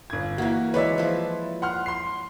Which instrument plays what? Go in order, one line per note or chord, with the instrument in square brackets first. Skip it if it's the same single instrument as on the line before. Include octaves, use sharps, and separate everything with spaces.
[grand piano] G1 G#6
[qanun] E3 A#3 [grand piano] F#4
[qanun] E3 G#3 C#5 [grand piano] B4 D5 E5
[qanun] F3 E4
[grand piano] F#5 C6 F6
C6 C7